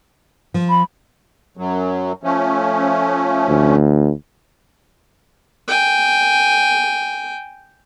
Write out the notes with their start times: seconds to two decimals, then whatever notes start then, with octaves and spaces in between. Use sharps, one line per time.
0.54 F3
0.70 B5
1.57 F#2 F#3
2.24 F3 A3 C#4
3.49 D2
5.68 G5 G#5